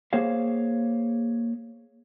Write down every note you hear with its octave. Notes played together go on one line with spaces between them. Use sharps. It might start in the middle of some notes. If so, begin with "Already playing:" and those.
A#3 G#4 C5 C#5 F5